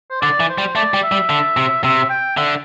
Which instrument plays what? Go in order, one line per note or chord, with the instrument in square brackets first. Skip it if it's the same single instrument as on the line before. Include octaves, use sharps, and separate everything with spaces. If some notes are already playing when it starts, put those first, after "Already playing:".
[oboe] C5
[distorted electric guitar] D3 [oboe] D5
[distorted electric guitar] E3
[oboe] C5
[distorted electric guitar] G3
[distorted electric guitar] A3 [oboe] D5
[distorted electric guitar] G3
[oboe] E5
[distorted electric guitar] G3
D3
C3
[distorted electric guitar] C3 [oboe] E5
[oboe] G5
[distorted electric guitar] D3 [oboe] E5